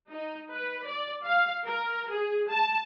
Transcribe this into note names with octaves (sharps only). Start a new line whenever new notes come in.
D#4
B4
D5
F5
A#4
G#4
A5